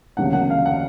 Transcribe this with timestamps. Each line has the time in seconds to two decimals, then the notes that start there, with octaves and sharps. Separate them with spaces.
0.17 E1 D2 C#3 F#3 A#3 F#5
0.33 F#5
0.50 F5
0.66 F#5